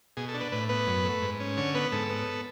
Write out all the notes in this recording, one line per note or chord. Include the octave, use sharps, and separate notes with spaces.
B2 G#4
A4
D4
B4
A2 B4
B3 B4
F#2
A3
G#2
C#4
D3 C#5
B3 B4
G#2 A4
B3